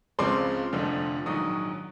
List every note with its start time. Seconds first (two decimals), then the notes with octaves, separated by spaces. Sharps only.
0.19 C#2 C#3 F3 G#3 C4 C6 D6
0.73 F1 F2 D3 F3 A3
1.26 A#1 G#2 D#3 F#3 C#6 D#6